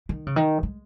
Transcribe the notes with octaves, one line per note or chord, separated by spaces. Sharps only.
D#3
C#3
D#3
G#3